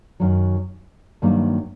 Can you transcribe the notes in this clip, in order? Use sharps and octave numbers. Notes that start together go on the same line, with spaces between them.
F#2 D#3 F#3
G2 D#3 F#3 A#3